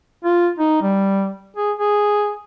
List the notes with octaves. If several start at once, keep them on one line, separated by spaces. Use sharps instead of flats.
F4
D#4
G3
G#4
G#4